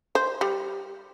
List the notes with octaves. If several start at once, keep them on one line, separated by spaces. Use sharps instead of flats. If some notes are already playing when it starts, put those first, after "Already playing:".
C5
G3